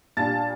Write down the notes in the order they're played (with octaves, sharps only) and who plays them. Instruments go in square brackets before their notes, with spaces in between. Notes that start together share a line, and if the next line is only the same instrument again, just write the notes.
[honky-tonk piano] A#2 G3 D4 A5 A6